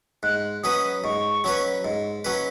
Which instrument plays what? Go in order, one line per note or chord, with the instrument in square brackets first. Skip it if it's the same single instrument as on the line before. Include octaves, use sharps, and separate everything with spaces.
[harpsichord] G#2 [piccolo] F#6
[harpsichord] F#3 C#4 B4 [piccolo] D#6
[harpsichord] G#2 [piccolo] C#6
[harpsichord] F#3 C#4 B4
G#2
F#3 C#4 B4